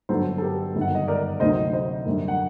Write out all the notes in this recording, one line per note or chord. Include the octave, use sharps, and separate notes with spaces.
G1 G2 F#3 A4 C5
A4
G4 A#4
G1 F#2 D#3 F#3
F#5
D#5
A#4 D5
D2 C3 F#3 A3 D#4 C5 D#5
C5 D#5
F#2 D3 G3
F#5